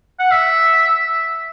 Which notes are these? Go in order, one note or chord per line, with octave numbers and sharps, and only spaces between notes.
F#5
E5